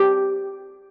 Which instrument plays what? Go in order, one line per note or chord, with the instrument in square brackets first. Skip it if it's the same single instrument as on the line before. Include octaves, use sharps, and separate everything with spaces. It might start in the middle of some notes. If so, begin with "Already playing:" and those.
Already playing: [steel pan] G4